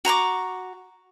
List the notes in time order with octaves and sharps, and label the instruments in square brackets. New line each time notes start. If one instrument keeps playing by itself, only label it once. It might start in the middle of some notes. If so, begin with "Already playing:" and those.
[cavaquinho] F#4 A#5 C#6 D6